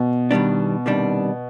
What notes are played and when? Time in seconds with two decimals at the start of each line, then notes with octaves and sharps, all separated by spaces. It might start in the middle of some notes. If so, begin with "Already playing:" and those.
Already playing: B2
0.31 D#3 G3 B3 D4
0.86 C3 D#3 G3 D4